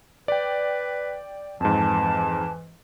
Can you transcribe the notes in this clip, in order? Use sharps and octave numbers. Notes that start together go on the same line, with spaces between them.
B4 D5 G5
F2 G#2 E3 A5